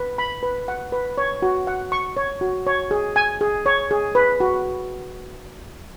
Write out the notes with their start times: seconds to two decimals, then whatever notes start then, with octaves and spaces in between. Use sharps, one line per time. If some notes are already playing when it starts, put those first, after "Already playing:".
Already playing: B4
0.18 B5
0.43 B4
0.68 F#5
0.92 B4
1.18 C#5
1.42 F#4
1.67 F#5
1.92 C#6
2.17 C#5
2.41 F#4
2.67 C#5
2.91 G#4
3.16 G#5
3.41 G#4
3.66 C#5
3.91 G#4
4.15 B4
4.40 F#4